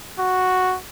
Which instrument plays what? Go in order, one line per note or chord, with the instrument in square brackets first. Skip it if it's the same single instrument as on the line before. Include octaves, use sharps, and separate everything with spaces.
[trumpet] F#4